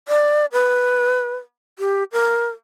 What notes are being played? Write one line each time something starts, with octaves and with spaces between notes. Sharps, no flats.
D5
B4
G4
A#4